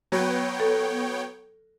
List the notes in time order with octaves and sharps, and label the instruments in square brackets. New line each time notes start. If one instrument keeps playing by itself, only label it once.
[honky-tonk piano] F#3 B4 [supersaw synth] B3 C#5 G5
[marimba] A4